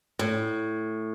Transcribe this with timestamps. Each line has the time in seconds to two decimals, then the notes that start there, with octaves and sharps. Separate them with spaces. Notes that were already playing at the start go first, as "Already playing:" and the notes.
0.19 A2